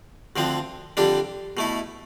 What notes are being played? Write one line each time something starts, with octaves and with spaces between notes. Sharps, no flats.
D2 D3 F3 C4
F2 D3 G3 D4
B2 A3 E4